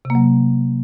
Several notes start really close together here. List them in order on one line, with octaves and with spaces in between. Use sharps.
C3 A#3 F#3